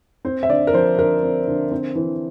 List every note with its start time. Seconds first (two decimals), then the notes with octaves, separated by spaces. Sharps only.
0.25 C4 C5
0.43 E5
0.49 D3 D5
0.67 A#4
0.73 F3 C5
0.98 D3 A#4
1.23 C4
1.47 D3
1.71 C4
1.95 E3